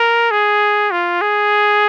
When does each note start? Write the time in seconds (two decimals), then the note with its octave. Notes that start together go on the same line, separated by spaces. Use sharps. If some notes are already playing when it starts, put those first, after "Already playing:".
Already playing: A#4
0.31 G#4
0.91 F4
1.21 G#4